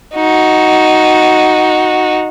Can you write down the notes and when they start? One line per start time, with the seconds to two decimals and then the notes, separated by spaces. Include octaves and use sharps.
0.15 D#4 F#4